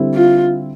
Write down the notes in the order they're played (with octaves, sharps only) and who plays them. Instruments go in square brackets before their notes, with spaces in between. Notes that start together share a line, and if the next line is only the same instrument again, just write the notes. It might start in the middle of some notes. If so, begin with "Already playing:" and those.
Already playing: [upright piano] D3 G3 C4 E4
[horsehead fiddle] F4